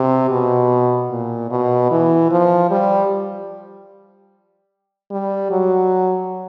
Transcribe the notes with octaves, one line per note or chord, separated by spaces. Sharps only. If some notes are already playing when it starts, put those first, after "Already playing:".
Already playing: C3
B2
A#2
B2
E3
F3
G3
G3
F#3